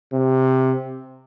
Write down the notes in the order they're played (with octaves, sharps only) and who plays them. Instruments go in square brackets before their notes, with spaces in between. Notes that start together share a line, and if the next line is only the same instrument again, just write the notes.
[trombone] C3